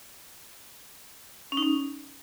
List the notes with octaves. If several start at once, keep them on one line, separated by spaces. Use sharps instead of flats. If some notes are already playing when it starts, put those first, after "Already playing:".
C#4
D#4
C#4